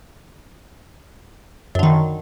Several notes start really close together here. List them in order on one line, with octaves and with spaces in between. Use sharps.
F#2 D3 D#3